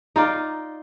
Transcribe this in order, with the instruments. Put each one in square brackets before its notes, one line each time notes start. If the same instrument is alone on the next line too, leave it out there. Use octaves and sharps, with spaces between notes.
[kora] D#4 F4 D5